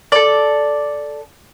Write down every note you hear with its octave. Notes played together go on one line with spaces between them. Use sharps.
A4 D5